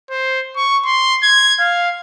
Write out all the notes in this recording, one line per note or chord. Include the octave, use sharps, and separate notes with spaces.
C5
C#6
C6
G#6
F5